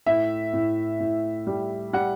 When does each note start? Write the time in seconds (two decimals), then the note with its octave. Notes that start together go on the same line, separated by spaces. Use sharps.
0.06 A2 E5
0.53 A2
1.00 A2
1.47 G3
1.93 G3 F#5